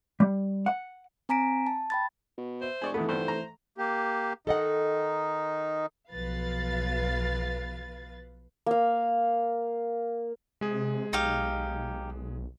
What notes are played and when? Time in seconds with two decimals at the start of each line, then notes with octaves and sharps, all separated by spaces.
0.20 G3
0.66 F#5
1.29 C4 G#5 A#5 B6 D7
1.67 A5
1.90 G5 B5 A6
2.38 B2
2.62 C5 E5
2.82 F1 G#4 D5 C#6
2.94 G#2 E3 A3 B3 A4
3.09 G2 D3 B3 C5
3.28 A#5
3.78 A#3 G4
4.47 D#3 D#4 A4 D#5 F#5
6.10 B1 F3 B4 F5 A6
8.66 A#3 F5
10.61 C3 G#3 G#4
11.13 B1 D#4 G4 F5